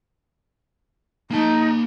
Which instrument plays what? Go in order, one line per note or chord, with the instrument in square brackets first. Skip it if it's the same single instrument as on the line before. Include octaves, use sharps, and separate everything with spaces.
[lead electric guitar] A#3 A5 [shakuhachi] D#4